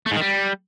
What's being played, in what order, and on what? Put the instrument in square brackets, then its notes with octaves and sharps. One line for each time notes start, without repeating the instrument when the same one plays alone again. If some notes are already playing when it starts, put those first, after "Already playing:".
[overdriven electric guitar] A3
G#2
D#3
G3